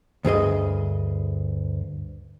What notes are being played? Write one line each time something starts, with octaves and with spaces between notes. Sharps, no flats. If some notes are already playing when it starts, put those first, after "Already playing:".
D2 G2 G#4 D#5